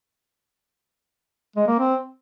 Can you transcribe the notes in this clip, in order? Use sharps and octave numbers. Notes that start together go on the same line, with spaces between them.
G#3
A#3
C4